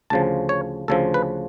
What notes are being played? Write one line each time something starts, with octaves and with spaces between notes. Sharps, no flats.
D2 C#3 F3 A5
C#5
D2 C#3 F3 A4
B4